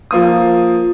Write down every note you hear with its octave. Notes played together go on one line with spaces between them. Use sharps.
F3 A#3 D#6